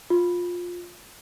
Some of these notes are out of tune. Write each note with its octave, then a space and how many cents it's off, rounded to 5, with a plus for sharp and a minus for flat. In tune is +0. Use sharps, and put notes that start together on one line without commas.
F4 +15